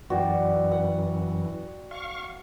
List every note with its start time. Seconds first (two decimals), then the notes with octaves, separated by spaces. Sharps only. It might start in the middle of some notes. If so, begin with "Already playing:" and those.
0.10 F#2 E3 F#4 D5 G5
0.72 F#5
1.91 F5 C#6